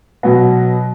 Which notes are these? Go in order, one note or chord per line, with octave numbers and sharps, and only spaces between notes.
B2 F#3 B3